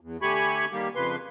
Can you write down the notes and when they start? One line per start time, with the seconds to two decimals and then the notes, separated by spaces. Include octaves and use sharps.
0.01 E2
0.22 D3 A3 G4 G#5 B5 C#6
0.72 D#3 G3 A#3 G4
0.95 F2 C#3 F3 B4 C6